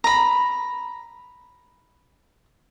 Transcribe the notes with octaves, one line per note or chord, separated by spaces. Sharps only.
A#5 B5